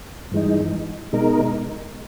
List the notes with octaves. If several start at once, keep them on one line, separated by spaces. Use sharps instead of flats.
G2 E3 G#3 D#4
B2 G#3 D#4 A#4